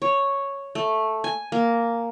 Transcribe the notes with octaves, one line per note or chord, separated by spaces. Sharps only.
C#5
A3
G#5
A#3